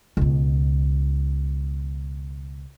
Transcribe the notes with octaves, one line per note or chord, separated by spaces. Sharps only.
C#2 B2